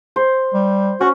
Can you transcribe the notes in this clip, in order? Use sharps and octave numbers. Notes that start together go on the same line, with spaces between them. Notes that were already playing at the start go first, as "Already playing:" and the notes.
C5
G3
C#4 F#4